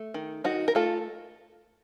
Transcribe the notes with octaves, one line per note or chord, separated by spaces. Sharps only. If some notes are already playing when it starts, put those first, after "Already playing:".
Already playing: A3
D#3
D#3 D#4 F#4
A#4
A3 F4 A4